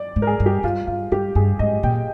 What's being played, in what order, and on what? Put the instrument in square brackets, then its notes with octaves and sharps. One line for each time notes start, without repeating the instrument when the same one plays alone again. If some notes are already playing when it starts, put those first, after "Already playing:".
Already playing: [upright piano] D5
[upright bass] G#2
[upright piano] A#4
G#4
[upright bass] G2
[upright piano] G4
[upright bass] G2 [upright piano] F4
[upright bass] G2 [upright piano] F4
[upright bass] G2 [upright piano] G4
[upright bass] G2 [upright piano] G#4
[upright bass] G#2 [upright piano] D#5
[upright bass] A#2 [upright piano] G5